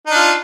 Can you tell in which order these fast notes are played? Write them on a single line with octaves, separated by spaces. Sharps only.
D#4 D4 F4